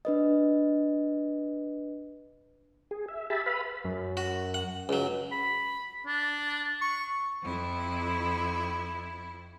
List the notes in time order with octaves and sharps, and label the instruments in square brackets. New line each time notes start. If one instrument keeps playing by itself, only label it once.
[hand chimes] D4 B4 D#5
[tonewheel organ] G#4
E5
G4 G#4 E5 A5 B5
B4 F5 B5
[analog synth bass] F#2
[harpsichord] F#4
F#5
C#2 F#3
[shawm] B5
D4
C#6
[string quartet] F2 E4